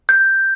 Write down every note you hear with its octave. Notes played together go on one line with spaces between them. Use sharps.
G6